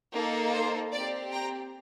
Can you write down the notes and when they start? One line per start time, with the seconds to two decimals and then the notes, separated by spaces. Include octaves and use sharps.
0.13 A#3 D#4 A4
0.53 C5
0.92 C4 G4 D5
1.32 G5 A#5